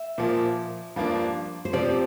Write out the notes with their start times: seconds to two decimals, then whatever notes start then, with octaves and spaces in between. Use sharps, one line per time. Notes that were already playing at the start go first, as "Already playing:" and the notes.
Already playing: E5
0.18 A#2 F3 A#3
0.96 G2 F3 A#3 D4
1.65 C5
1.73 C3 F3 C4 G4 D5